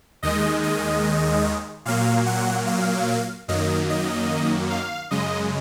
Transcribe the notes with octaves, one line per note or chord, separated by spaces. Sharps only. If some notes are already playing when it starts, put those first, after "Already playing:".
D#2 D#3 G#3 D#5
D#5
A#2 F#3 A#3 F5
F#5
F5
F#2 D#3 F#3 A#3 D#5
D#5
F5
F#2 C#3 G#3 D#5